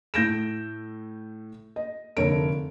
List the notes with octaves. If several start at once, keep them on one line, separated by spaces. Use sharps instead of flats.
A2 A3 G6 A#6 D7 E7
D#5
F1 D3 A#4 C#5 D7